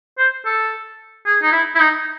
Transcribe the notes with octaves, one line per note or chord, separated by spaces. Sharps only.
C5
A4
G#4
D#4
E4
E4
D#4